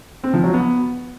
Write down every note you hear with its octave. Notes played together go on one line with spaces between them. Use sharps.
C4
F3
F#3
B3